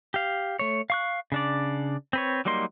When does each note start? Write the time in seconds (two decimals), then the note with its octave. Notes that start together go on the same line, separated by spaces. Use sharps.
0.14 G4 F5
0.59 A3 C#5
0.90 F5 C#6 F#6
1.32 C#3 D4 D5
2.13 C4 B4 C#5
2.45 F#3 G3 A#3 D#4 C6